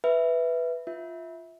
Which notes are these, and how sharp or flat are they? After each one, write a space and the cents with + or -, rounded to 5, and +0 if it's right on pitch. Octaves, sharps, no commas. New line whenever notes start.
B4 +0 E5 +0
F4 +0 E5 -20